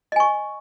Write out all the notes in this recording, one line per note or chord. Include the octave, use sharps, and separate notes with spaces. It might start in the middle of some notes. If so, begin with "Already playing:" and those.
D#5 G#5 C#6